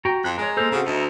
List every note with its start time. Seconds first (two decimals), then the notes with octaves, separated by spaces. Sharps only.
0.05 F#4 G5 A#5
0.24 F2 F#6
0.38 G#3 A#4 C#5
0.57 A#3 A4 A#4 C5
0.72 C#3 C4 F#4
0.86 D2 D#4 D#5 E5